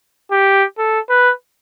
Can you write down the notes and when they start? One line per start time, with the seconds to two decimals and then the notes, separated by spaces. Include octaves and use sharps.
0.32 G4
0.78 A4
1.10 B4